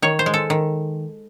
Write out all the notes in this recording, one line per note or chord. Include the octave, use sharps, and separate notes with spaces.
D#3 C#5
C5
G#3
A4
D#3